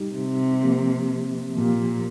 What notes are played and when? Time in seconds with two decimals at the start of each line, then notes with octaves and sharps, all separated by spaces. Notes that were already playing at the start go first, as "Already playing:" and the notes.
Already playing: G3 D#4 G4
0.15 C3
0.63 F3 A#3 G4
1.57 A#2 F3 A#3 G4